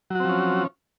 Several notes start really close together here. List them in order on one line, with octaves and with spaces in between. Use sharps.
F#3 F#4 C4 F3 C#4